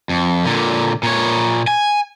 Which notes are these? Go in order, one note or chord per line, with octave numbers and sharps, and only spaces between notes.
F2
A#2 D3
A#2 C#5
G#5